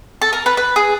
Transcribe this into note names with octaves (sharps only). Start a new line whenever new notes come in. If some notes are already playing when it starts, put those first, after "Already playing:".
A4
A#4
B4
B4
G#4